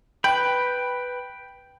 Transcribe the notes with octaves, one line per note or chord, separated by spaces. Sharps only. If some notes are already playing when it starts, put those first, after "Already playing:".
B4 G5 B5